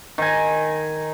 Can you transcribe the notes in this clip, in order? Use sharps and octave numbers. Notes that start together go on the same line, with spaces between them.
D#3 G#5